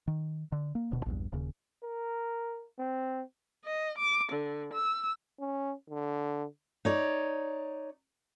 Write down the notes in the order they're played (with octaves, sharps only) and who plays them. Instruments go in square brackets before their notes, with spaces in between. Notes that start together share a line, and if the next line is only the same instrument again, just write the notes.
[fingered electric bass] D#3
D3
A#3
D1 D2 B2
A#1 E2 G2
D#1 D#2 C#3
[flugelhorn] A#4
C4
[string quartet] D#5
D6
D3
E6
[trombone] C#4
D3
[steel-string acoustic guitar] D#4 C#5 D5